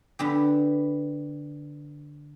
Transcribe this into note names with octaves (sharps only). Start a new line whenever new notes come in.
D3 B3 G4